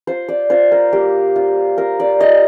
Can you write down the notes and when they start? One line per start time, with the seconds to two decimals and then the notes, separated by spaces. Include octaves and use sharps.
0.07 F4 C5
0.29 D5
0.50 F4 C5
0.72 A#4
0.93 A#3 G4
1.36 F4
1.78 F4 A#4
2.00 D5
2.20 F4 D#5